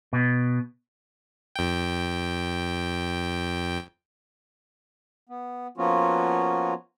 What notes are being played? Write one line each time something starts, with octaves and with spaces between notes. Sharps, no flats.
B2
F2 G5
B3
F3 A#3 B3 C#4 F4 F#4